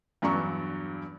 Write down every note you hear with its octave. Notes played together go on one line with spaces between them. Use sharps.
E2 G2 F#3 D4 A#5 C#6